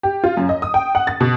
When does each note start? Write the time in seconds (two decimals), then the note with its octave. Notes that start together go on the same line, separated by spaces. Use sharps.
0.03 G4
0.24 F4
0.37 F#2
0.49 D#5
0.62 D#6
0.74 G5
0.95 F#5
1.07 A6
1.20 B2